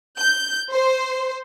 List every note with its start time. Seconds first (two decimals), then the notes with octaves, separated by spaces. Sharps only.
0.19 G6
0.71 C5